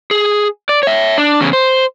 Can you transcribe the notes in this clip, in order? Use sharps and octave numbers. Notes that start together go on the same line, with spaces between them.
G#4
D5
C#5 E5
D4
E2 C#3
C5